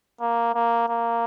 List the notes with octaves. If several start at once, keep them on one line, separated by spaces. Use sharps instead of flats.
A#3
A#3
A#3